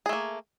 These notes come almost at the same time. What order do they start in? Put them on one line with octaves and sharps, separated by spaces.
G#4 A3 A#3